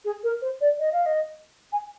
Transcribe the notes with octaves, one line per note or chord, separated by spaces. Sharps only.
G#4
A#4
C5
D5
D#5
F5
D#5
G#5